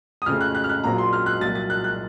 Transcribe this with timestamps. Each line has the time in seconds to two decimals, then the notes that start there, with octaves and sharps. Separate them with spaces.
0.22 D#6
0.26 F2 C#3 A3 C4 F6
0.41 F#6
0.55 F#6
0.64 F6
0.69 F#6
0.84 A#1 A#2 F#3 C4 A#5
0.98 C6
1.13 F6
1.26 F#6
1.41 C2 A#2 F#3 A6
1.55 A6
1.70 F#6
1.84 F#6